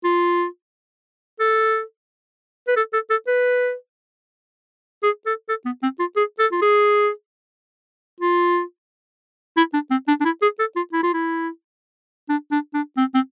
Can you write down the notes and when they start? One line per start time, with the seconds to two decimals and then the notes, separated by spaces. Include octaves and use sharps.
0.04 F4
1.40 A4
2.68 B4
2.76 A4
2.93 A4
3.10 A4
3.27 B4
5.03 G#4
5.26 A4
5.49 A4
5.65 B3
5.82 C4
5.99 F4
6.16 G#4
6.39 A4
6.52 F4
6.62 G#4
8.20 F4
9.57 E4
9.74 D4
9.91 C4
10.08 D4
10.20 D4
10.25 E4
10.42 G#4
10.59 A4
10.76 F4
10.93 E4
11.03 F4
11.14 E4
12.29 D4
12.51 D4
12.74 D4
12.97 C4
13.14 C4